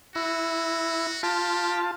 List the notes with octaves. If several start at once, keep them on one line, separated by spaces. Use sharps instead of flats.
E4 F#4
F4 G4 A5